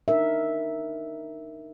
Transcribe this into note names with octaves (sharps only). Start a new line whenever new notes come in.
D4 D#4 A#4 E5